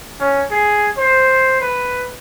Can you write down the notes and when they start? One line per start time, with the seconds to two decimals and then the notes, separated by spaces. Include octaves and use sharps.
0.20 C#4
0.51 G#4
0.97 C5
1.60 B4